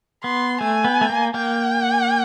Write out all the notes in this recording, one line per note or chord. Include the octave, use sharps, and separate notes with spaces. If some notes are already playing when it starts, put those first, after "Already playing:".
B3 C6
A3 G#5
B3
A3
A#3
A#3 G5